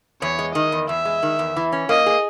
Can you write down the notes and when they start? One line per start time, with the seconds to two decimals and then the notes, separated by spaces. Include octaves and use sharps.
0.22 E2 C#5
0.39 G#3
0.55 D#3 D#5
0.72 E2
0.89 E2 E5
1.05 G#3
1.23 D#3
1.39 E2
1.56 E3
1.72 C#4
1.89 A#3 D#5
2.06 G#4